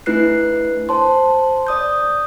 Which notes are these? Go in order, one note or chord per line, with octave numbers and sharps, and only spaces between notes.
A3 D4 E4 B4 F#6 C7
C5 A5 C6
D5 D#6 G6